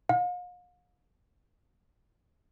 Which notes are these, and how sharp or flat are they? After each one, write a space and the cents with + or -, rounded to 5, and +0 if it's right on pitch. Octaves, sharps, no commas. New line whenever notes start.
F5 +45